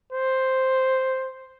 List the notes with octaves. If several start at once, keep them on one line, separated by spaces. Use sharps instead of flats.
C5